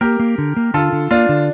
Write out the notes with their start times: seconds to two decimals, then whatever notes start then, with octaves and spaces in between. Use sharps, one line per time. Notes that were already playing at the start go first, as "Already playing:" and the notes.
0.01 A#3 G4 A#4
0.20 A#3
0.38 D3
0.57 A#3
0.74 D3 F4 A4
0.92 D3
1.11 A#3 D4 F4
1.29 D3